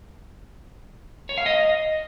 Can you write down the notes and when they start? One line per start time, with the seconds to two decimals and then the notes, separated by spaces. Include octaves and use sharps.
1.29 C#5
1.38 F5
1.46 D#5